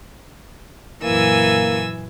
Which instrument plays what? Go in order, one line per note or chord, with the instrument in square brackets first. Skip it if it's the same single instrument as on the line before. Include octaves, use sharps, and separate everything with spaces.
[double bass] F#2 A#2 [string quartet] E3 G#5 E6 [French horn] A#3